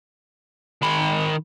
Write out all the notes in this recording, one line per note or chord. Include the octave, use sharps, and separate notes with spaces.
D#3 B5